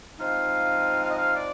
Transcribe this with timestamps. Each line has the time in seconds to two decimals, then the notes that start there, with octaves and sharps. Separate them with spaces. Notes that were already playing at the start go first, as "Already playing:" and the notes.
0.18 F3 G#3 C4 D#4 F5
1.03 F5
1.10 D#5
1.17 F5
1.34 D5